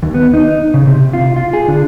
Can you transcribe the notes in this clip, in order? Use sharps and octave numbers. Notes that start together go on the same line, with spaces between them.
D#2
B3
D#4
C#3
C3
F4
F4
G#4
D3